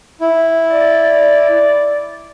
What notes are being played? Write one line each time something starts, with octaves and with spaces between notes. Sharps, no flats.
E4
D5